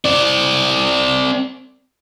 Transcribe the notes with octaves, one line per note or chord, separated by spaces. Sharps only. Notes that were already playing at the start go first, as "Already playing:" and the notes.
C4 D5